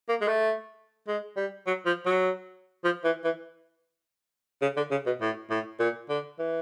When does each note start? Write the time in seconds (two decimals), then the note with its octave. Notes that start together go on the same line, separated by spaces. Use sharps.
0.09 A#3
0.21 G#3
0.28 A3
1.08 G#3
1.37 G3
1.67 F#3
1.86 F3
2.06 F#3
2.84 F3
3.04 E3
3.24 E3
4.62 C#3
4.77 D3
4.91 C#3
5.06 B2
5.21 A2
5.50 A2
5.80 A#2
6.09 D3
6.39 E3